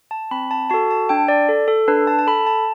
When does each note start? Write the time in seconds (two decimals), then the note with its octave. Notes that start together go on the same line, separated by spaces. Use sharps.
0.11 A5
0.31 C4 B5
0.51 A5
0.70 F#4 A4 A5
0.90 A5
1.09 D4 G5
1.28 D5
1.49 A4
1.68 A4
1.88 D4 B4
2.07 A5
2.19 A5
2.27 A4 B5
2.46 A5